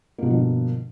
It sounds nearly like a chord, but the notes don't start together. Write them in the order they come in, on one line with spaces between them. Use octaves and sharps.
A#3 B2 D3 F3 G2